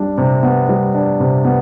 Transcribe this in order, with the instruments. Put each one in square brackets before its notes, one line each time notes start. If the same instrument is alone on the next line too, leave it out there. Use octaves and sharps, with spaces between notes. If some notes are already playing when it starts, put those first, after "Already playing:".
Already playing: [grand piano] G3 D4
C3
B3
G3
D4
C3
B3